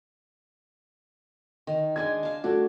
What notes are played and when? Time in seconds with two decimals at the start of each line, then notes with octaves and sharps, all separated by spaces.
1.67 D#3
1.96 G#3 D4 G#5 G#6
2.23 F5 A5
2.44 A3 D4 F#4